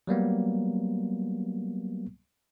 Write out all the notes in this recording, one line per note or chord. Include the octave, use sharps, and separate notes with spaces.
F#3 G3 A#3 B3